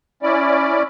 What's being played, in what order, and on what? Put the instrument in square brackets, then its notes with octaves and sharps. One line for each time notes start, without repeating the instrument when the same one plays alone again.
[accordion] C#4 E4 D5